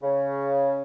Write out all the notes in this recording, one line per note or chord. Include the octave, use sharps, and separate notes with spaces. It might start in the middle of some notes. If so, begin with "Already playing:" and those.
C#3